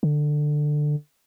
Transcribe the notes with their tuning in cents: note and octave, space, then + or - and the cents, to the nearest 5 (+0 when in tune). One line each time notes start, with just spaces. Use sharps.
D3 +15